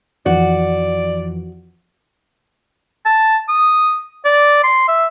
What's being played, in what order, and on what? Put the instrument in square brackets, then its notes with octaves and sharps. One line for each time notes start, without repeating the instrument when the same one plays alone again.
[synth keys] F2 E3 F3 [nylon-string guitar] F#4 [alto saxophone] D5
[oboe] A5
D#6
D5
C6
E5